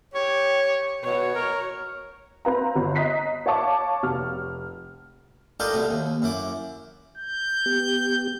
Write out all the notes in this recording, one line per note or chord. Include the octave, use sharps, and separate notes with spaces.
G4 C#5
B2 F#4 C#5
A#4
C4 B4 F5 A#5
G1
D#5 A#5 F#6 B6 C7
C#5 F5 A5 C#6 D6
F1 F6
D4 D#4 F4 G4 A4 A#4
C2 B2 A3
D#2
F#2 E4 D6
G6
B3 G4